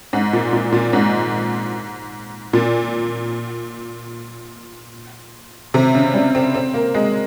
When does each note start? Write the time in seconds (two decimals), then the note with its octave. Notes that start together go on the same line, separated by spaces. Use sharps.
0.13 G#2
0.33 A#2
0.53 A#2
0.72 A#2
0.93 G#2
2.53 A#2
5.74 C3
5.94 C#3
6.14 G3
6.35 C4
6.55 C4
6.74 A#3
6.94 G#3